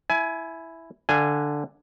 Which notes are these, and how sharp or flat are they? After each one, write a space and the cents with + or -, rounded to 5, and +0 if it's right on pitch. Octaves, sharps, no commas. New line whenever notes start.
E4 +0 G#5 +25
D3 +0 F5 -30 G#5 +0